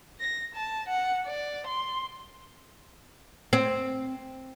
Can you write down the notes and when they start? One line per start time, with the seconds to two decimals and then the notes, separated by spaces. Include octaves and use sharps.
0.20 A#6
0.55 A5
0.88 F#5
1.26 D5
1.67 C6
3.53 C4